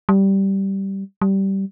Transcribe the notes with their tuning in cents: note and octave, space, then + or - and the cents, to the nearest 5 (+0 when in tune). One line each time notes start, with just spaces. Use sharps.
G3 -10
G3 -15